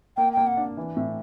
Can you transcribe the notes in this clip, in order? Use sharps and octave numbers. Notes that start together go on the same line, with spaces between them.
A#3 G5
A#3 G5
F#5
D4
E3
A2